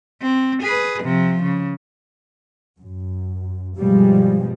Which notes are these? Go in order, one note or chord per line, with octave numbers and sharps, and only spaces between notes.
C4
G#4 B4
C3 F3
C#3
F#2
G2 B2 F3 G3 G#3